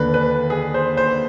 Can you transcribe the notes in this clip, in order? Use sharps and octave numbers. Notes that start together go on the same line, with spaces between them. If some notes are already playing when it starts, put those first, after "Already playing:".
Already playing: D#2 D3 B4
B4
G#4
C5
C5